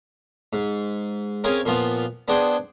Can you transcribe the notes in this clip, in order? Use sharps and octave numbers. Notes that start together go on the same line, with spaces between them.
G#2
C4 C#4 G#4 A#4 F5 G#5
A#2 F3 B3 F4
B3 D4 G#4 C5 G5